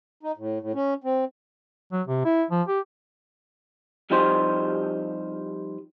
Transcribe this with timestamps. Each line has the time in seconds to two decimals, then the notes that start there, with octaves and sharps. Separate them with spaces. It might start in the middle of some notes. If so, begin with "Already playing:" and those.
0.23 D#4
0.37 A2
0.60 A2
0.74 C#4
1.04 C4
1.92 F#3
2.08 C3
2.25 E4
2.51 F3
2.68 G4
4.10 F2 F3 G3 D#4 G4 C5